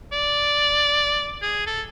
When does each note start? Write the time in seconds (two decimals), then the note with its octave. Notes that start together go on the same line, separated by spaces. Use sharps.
0.12 D5
1.42 G#4
1.67 A4